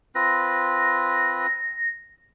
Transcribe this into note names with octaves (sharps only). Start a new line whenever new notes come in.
C4 F4 B4 A#6